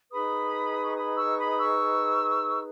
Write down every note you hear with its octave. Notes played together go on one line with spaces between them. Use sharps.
D#4 G#4 B4 B5 D#6
C#6
B5 D#6
C#6 E6
B5 D#6
D#6
C#6 E6